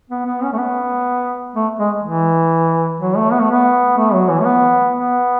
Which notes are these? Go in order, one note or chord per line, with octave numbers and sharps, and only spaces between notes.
B3
B3
C#4
A3
B3
A3
G#3
E3
F#3
A3
B3
A3
B3
A3
F#3
E3
A3
B3
B3